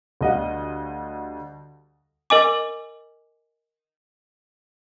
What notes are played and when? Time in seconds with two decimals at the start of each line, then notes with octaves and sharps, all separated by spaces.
0.21 D2 G3 D#5 F5 F#5
2.30 A#4 D#5 G#5 D6